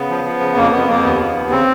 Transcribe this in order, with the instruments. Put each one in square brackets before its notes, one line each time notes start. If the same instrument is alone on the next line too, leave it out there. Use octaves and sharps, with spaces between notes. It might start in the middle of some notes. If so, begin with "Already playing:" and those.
Already playing: [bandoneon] C#3 B3
F3
F3
C#3
F2 A#3
F2 B3
F2 A#3
D#2 B3
C#3
D#2
C#3 C4